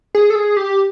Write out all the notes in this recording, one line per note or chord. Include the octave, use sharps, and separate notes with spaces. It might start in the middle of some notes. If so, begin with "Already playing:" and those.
G#4
A4
G#4
G4